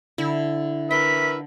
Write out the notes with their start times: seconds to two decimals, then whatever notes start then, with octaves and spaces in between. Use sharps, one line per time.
0.18 D3 E4
0.91 A#4 B4 E5 G5 B6